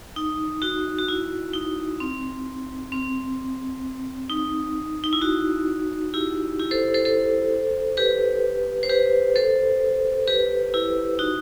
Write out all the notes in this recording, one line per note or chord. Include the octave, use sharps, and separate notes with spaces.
D#4
D#4 F#4
F#4
E4
D#4
C4
C4
D#4
D#4
E4
D#4 F#4
E4 G4
E4 G4
A4 C5
A4 C5
A4 C5
G4 B4
C5
G4 B4
A4 C5
G4 B4
E4 G4
D#4 F#4